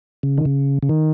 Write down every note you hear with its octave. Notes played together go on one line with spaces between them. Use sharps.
C#3
D#3
C#3
C#3
D#3